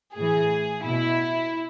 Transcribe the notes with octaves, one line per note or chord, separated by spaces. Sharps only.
A2 E3 G#4
B2 E4